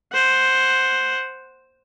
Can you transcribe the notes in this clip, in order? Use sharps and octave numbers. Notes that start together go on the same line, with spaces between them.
C5 F#5